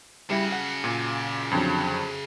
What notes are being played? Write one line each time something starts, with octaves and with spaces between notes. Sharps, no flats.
C#3 G3 E4 F#4
F#5
A#2
F2 D3 F#3